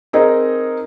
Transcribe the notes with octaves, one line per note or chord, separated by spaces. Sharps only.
C4 D#4 G#4 A#4 D#5